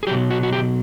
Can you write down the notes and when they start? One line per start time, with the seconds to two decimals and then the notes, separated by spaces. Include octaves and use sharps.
0.03 G#4
0.07 F#3 G4
0.11 B2
0.30 F#4
0.43 F#4
0.53 G4